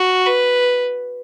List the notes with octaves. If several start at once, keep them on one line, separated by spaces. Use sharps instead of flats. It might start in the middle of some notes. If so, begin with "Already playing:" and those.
Already playing: F#4
B4